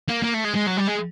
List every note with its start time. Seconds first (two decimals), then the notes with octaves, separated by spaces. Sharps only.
0.09 A#3
0.24 A#3
0.34 A3
0.45 G#3
0.56 G#3
0.67 F#3
0.78 G3
0.88 G#3